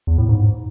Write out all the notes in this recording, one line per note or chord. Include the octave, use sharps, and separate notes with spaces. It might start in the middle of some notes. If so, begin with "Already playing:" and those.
E2
A2
G#2